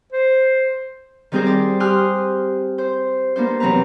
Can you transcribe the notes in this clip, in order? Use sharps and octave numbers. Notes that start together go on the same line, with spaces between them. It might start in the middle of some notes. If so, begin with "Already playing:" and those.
C5
D#3 G3 C4 D#4 G#4 C5
D5
G4 G#5 C6 D#6 F6 F#6
C5
A#3 B3 D4 C5
E2 C3 F#3 C4 B4 A#5